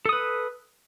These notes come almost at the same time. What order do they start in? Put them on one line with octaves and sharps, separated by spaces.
A4 D#6 B4